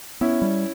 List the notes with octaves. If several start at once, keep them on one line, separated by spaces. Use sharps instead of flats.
B3 C#4 E4
G3